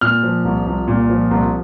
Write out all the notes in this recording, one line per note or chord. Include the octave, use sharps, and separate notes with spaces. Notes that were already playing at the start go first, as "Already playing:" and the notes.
A#2 F6
F3
C2
C2
A#2
F3
C2